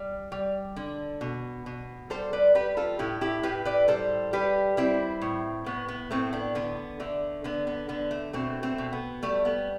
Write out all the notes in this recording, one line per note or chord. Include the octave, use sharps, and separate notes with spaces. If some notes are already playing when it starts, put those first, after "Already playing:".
Already playing: G3
G3
D3
B2
B2
G3 A4 C5
B4 D5
G3 G4 B4
F4 A4
A2 E4 G4
E4 G4
A2 G4 B4
B4 D5
G3 A4 C5
G3 G4 B4
G3 C4 E4
A2
A2 B3
B3
A2 A3 C4
B3 D4
D3 B3
D3 A3
D3 B3
B3
D3 B3
A3
B2 A3 C4
A3 C4
B2
B3
G3 A3
B3